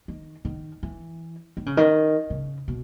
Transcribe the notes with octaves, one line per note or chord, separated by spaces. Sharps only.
D#3
D#3
E3
D#3
C#3
D#3
C#3
B2